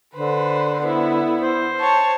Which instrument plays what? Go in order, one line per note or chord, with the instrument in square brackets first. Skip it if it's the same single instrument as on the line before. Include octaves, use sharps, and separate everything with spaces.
[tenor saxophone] D3 [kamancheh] B4 C5
[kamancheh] B3 E4
[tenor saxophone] C5
[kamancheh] C#5 A5